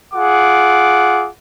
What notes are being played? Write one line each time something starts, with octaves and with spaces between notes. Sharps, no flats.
F4 G#4 F#5 D6